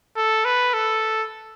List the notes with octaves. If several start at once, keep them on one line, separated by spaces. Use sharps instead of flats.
A4
B4
A4